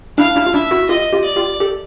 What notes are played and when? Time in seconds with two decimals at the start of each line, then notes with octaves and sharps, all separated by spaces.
0.18 D4 E4 F5
0.36 D4 E4
0.46 F4
0.54 D4 E4 E5
0.71 E4 F#4
0.89 F4 G4 D#5
1.13 F4 G4
1.25 D5
1.36 F4 G4
1.60 G4 A4